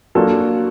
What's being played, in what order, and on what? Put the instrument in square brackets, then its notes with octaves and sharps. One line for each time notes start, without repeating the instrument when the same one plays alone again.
[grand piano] F#3 A#3 D4 F4 A4